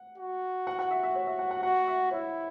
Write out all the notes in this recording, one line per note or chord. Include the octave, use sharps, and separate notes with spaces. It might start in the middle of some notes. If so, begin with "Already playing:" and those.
Already playing: F#5
F#4
F#5
F#5
E5
E5
C#5
E5
F#5
F#5
F#4 F#5
E5
E4 C#5